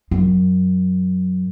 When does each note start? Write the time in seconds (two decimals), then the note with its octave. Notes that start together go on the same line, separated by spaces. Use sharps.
0.11 F#2